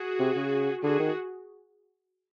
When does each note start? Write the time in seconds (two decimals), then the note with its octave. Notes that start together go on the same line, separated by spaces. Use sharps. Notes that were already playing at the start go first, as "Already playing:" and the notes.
Already playing: F#4 G#4
0.19 C3
0.36 C#3
0.83 D3 F#4 G#4
0.99 D#3